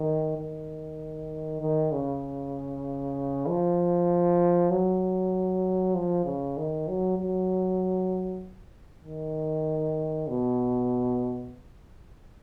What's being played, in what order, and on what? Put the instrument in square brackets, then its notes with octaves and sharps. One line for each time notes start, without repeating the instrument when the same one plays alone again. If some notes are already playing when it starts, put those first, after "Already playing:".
Already playing: [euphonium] D#3
D#3
D#3
C#3
F3
F#3
F3
C#3
D#3
F#3
F#3
D#3
B2